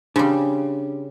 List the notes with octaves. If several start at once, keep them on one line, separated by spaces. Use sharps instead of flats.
C#3 G3 D4 C6